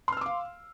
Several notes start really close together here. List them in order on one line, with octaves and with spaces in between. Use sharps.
C6 F6 E6 D6 F5